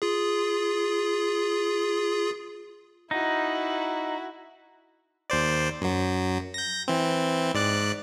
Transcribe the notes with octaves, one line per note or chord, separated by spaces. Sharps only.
F4 G#4
D#4 E4 F#4
D#2 C5 D5
F#2 F#3
G6 A#6
E3 C4
G#2 D5 F#6